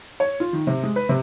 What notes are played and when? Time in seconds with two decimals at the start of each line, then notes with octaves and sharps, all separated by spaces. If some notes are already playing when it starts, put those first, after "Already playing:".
0.20 C#5
0.40 F4
0.53 D#3
0.67 C3
0.83 G#3
0.96 B4
1.09 C3